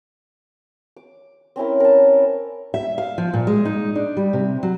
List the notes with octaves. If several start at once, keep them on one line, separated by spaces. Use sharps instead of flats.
D6
C4 C#4 E4 A#4
A#4 A5
E5
F5
F3
A#2
G#3
D#4
D4
G3
C3
F#3